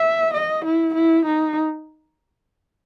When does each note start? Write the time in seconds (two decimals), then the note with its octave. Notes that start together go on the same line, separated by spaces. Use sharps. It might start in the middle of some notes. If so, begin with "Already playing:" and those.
Already playing: E5
0.34 D#5
0.65 E4
0.95 E4
1.26 D#4